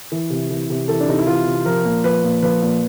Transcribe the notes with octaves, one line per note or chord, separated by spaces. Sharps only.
E3
C3
E3
C3
E3 A4
D4
C3 D#4
E4
E3 F4
C3
F3 A#4
A#2
F3 B4
A#2
F3 B4
A#2